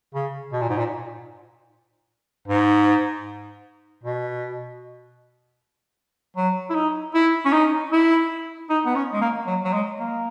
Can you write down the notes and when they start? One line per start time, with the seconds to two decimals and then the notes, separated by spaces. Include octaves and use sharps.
0.15 C#3
0.52 B2
0.61 A#2
0.69 G#2
0.78 A#2
2.48 G#2
4.03 B2
6.37 F#3
6.70 E4
6.74 D#4
7.14 E4
7.45 C#4
7.52 D#4
7.92 E4
8.69 D#4
8.86 B3
8.95 C#4
9.13 G#3
9.21 A#3
9.47 F#3
9.64 F#3
9.73 G#3
9.99 A#3